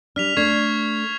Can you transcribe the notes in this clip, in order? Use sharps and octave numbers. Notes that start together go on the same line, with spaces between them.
G3 D4 F6 B6 F7
A3 D4 C#6 G#6 C7